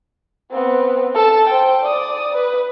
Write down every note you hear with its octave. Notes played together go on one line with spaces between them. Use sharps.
B3 C4
A4 A5
C5 G5
D5 D#6
B4